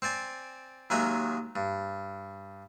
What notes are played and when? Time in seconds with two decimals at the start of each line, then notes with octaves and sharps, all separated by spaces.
0.02 C4 C5 D5 G#5
0.90 D#2 D#3 F#3 G#3 E5 G#5
1.56 G2